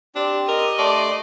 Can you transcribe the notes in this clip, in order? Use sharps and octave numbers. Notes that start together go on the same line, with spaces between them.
C4 D4 G4
A#4 D#5
A3 D4 D5 C6